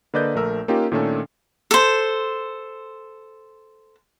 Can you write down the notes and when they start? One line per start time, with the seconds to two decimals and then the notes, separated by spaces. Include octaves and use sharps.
0.14 D3 A#3 B4 D5 D#5 G6
0.35 A#1 A3 A#4 E6
0.68 A#3 C#4 D#4 F4 G4 A#4
0.92 A#2 D#3 A3 C#4 D4 A4
1.71 A4 C5